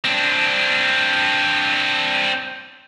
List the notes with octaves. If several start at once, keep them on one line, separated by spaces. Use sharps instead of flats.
C4 D4